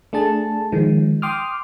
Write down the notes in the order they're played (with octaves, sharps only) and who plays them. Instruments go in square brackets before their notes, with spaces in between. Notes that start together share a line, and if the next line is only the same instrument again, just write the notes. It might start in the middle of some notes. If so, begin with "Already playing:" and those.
[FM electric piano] A3 D4 G#4 A5
D#3 F3 G#3
G5 C6 D6 D#6 F6